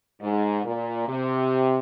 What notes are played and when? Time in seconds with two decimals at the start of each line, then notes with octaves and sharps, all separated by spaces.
0.21 G#2
0.65 A#2
1.08 C3